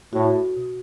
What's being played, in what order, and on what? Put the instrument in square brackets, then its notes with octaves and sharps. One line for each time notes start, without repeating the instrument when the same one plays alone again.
[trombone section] A2 [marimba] F#4
[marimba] B2